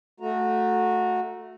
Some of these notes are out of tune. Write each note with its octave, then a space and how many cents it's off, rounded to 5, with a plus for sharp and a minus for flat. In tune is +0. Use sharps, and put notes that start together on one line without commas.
A3 +0 F#4 -20 A#5 +0